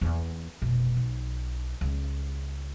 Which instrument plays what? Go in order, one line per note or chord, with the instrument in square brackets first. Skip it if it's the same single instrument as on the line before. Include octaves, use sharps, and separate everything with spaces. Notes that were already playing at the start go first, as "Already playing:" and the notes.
[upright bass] E2 A#3
F1 B2
B1
C#2